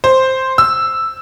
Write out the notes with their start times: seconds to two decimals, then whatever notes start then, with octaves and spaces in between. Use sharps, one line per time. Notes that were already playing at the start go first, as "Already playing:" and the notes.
0.04 C5
0.58 E6